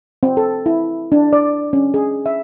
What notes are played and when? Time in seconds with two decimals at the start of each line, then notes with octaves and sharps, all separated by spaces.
0.23 C4
0.37 A4
0.66 E4
1.12 D4
1.33 D5
1.73 C#4
1.94 G#4
2.26 E5